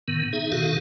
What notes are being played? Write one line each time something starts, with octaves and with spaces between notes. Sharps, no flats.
A2 D#3 B3
D#4 G#4 E5
B2 D#3 F#4 A4 F5